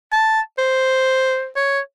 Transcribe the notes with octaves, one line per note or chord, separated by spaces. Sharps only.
A5
C5
C#5